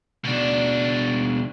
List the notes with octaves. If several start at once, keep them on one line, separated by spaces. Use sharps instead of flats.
B2 D4